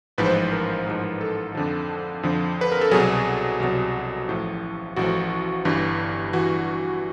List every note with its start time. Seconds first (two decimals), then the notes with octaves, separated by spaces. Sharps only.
0.18 A1 G#2 F3 B4
0.26 C5
0.34 B4
0.52 A#4
0.86 A1 G#2 F3
1.21 A4
1.55 F2 D3 F3
2.23 F2 D3 F3
2.61 B4
2.72 A#4
2.81 A4
2.91 C2 B2 F#3 G#4
3.60 C2 B2 F#3
4.28 A1 A2 F3
4.96 A1 A2 F3 F#4
5.65 G1 G2 E3
6.33 E3 F#4